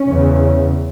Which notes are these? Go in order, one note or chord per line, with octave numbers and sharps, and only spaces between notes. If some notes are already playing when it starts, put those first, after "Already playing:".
Already playing: C#4
E2 C#3